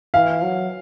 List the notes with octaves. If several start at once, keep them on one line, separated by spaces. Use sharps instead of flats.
E3 F5
F#3